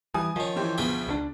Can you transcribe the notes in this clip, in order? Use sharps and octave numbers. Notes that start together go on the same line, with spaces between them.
E3 G3 G#5 D#6
D#3 F3 C#4
E3 G4 C5
D2 B2 B3 G#4 G5 B5
C#2 G#3 D4